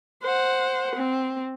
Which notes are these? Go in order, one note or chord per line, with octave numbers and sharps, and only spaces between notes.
C5 F#5
C4